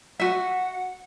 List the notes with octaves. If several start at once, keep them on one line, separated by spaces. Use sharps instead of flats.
F#4 E5 F#5